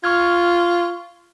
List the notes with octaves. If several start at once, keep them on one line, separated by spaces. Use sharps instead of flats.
F4 C#6 F6 G#6